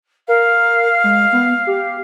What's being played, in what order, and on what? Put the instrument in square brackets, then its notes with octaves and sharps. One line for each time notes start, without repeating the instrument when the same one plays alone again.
[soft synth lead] A#4 [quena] F5
[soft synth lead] G#3
B3
G4